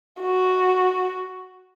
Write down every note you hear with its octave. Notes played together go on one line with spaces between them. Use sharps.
F#4